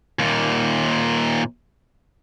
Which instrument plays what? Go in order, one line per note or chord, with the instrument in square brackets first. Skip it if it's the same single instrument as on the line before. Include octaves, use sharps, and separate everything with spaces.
[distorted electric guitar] D#2 A#2